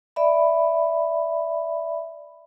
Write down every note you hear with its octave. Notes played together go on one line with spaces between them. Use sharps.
D5 E5 B5